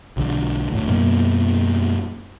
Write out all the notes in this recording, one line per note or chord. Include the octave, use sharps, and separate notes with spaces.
B1 D3
D2 A2
F#2 B2 A#3